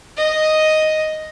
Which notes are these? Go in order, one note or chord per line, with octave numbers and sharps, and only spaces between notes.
D#5